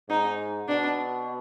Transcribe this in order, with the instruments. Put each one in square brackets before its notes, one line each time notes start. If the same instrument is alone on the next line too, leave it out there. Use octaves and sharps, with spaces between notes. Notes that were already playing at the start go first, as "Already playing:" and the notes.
[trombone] G#2 [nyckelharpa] D#4
[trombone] B2 [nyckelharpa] D4